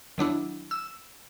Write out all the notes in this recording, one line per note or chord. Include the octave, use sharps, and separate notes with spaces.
D#3 F#3 D4 E4
E6